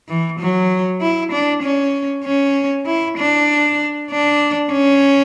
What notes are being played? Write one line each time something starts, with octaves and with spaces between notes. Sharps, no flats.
E3
F#3
E4
D4
C#4
C#4
E4
D4
D4
C#4